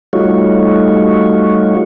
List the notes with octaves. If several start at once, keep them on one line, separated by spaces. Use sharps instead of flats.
G3 A3 D#4 F4 F#4 C#5